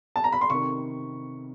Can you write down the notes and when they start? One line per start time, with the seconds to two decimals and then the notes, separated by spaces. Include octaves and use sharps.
0.16 A5
0.24 A#5
0.32 B5
0.41 C6
0.50 C3 D#3 C#6